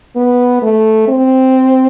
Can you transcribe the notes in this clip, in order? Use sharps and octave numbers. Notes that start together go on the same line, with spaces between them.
B3
A3
C4